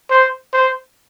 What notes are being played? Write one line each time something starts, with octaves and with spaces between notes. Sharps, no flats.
C5
C5